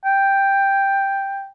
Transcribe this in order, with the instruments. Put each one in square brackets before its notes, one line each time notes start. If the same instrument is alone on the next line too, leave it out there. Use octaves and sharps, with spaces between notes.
[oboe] G5